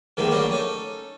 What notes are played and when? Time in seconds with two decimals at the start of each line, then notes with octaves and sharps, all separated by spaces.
0.17 G#2 D#3 G3 A3 A#3
0.31 F#3 G3 A#3 C#4 D4
0.51 C#4 D#4 A4